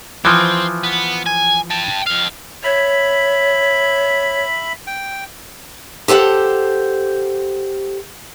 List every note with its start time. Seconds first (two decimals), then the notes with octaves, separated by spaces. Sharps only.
0.25 E3 F3 C4
0.84 B3
1.26 G#5
1.71 G5 A5
2.07 F2 F5
2.64 C#5 E5 B5
4.87 G5
6.08 G4 A4 C5 F5 F#5